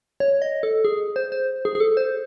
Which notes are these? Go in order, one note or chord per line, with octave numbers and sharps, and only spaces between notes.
C#5
D#5
A4
G#4
C5
C5
G#4
G#4
A4
C5